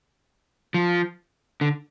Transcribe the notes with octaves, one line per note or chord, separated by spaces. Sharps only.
F3
D3